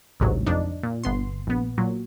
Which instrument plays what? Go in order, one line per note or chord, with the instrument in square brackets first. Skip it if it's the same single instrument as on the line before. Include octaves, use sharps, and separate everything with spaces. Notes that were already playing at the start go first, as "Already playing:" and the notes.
[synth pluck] A1 D2 G#2 C3 F#3
F2 D4 D#4
A#2
G1 B3 C6
A#1 B3
A#2 F#3